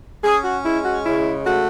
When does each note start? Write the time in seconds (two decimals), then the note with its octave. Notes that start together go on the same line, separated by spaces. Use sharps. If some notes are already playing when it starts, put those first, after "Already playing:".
0.24 C#4 G#4
0.44 F#4
0.65 G#3 E4
0.84 F#4
1.05 C#3 E4
1.46 A3 F#4